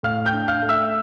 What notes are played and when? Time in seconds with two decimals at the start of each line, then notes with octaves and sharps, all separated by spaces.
0.03 A2 F5 F6
0.26 G5 G6
0.33 D4
0.48 F5 F6
0.62 A3
0.69 E5 E6